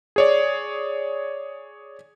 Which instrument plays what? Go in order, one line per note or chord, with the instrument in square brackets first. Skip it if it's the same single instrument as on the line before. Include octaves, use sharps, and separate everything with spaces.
[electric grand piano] G#4 C#5 D5